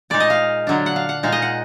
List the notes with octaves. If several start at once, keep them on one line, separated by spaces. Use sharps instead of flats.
A#2 G#3 D#4 D5
D#5
F5
D3 F#3 D4
F#5
F5
F#5
A#2 G#3 D#4 F5
D#5
F#5